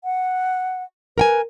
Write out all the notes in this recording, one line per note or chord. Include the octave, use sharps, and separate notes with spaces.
F#5
A#4 B4 G5 G#5